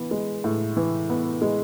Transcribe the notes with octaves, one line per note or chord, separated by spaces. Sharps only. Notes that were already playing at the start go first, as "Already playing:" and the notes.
Already playing: E3 B3
G#3
A2
E3
B3
G#3